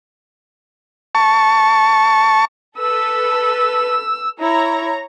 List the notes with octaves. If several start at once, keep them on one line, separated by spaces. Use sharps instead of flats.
A5 C#6
A4 B4 E6
E4 C#5 A#5